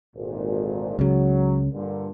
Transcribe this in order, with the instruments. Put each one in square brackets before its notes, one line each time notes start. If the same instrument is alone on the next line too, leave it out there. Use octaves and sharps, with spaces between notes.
[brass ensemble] G#1 D2 A#2
[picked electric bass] C#2 C#3 [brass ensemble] F#3
[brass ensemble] G2 A#2 D3